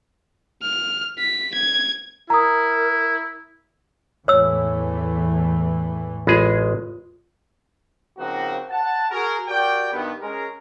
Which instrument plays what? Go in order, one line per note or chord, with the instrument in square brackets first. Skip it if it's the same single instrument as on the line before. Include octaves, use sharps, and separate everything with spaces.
[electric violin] F6
B6
G#6
[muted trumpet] E4 [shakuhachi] A#4 [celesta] A#5 D#6
[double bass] E2 [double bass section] A2 E3 A3 [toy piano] C#5 E6
[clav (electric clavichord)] A1 G#3 G#4 [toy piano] F4
[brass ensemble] C#3 F3 A#3 C4 D#4 F#4
F#5 A5
F#4 G#4 A#4
F#4 G4 A#4 D5 G5
G2 D#3 B3
G#3 C#4 A#4